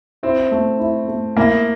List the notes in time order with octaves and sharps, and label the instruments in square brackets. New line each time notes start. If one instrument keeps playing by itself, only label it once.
[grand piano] C4 [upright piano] E4
[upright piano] A3
E4
A3
[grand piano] A#3 [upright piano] E4